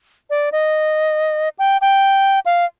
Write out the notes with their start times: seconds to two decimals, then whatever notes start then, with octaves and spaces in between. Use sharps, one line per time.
0.30 D5
0.52 D#5
1.59 G5
1.81 G5
2.46 F5